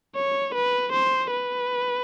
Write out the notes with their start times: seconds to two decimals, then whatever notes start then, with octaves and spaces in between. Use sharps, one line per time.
0.15 C#5
0.55 B4
0.92 C5
1.31 B4